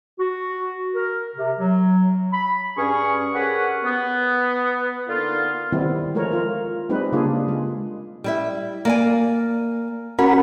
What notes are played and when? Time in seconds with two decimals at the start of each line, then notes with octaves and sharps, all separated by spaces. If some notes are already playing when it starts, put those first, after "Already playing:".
0.18 F#4
0.95 A#4
1.36 C3
1.59 F#3
2.32 B5
2.78 G2 C#4 G#4 C#6
3.34 G4 G#4 A#4 B4 C#5 F#5
3.84 B3
5.09 D3 A#3 B3 D#4 F4
5.72 D#3 G3 B3 C4 E4
6.15 F3 G#3 A3 A#4 C#5
6.32 F4 A#4
6.89 G3 G#3 C4 D#4 B4
7.12 C#3 G3 A#3 D4 F4 G#4
7.48 G#3
8.24 G3 E4 E5
8.85 A#3 D5 G#5
10.19 C#4 F#4 A#4 B5